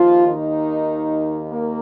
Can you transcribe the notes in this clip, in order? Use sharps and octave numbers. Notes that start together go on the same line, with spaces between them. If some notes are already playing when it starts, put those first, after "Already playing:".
Already playing: D#2 F3 F4
D#3 D#4
A#3 A#4